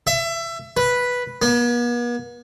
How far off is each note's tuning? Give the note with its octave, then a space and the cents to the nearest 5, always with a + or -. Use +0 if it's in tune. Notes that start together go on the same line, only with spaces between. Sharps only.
E5 +25
B4 -5
B3 -45